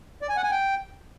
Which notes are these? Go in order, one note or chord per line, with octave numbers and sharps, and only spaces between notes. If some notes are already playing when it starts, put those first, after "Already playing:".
D5
G#5
F#5
G#5
G5